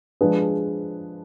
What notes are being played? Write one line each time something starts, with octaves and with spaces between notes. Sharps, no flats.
F3 G#3 D4 G#4 B4